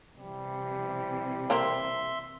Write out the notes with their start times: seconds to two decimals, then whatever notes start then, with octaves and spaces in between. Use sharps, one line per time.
0.18 C3 E3 G3
1.50 A#3 C4 A#4 E5 C6